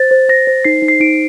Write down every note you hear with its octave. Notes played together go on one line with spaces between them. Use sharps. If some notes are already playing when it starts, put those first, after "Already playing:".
Already playing: C5 A6
C5
C5 A#6
C5
D#4 C7
D#4
C7
D#4 D7